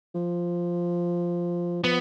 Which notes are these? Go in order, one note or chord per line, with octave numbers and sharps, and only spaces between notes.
F3
F3 B3